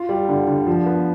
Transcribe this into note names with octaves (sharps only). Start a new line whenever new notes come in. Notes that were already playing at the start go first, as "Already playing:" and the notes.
Already playing: F4
G3
D3
D3
F3
B3